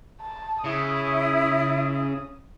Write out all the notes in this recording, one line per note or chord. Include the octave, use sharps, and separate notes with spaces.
A5
C#3 E4 D#6